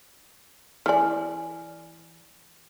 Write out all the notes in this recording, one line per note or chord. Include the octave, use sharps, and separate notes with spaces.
E3 D5 G#5 F6